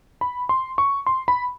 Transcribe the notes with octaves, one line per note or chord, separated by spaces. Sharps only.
B5
C6
C#6
C6
B5